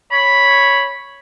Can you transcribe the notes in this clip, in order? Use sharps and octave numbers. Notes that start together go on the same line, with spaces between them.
C#5 B5